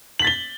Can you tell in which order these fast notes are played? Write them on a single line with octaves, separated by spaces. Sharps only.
F#7 B6 A6 G7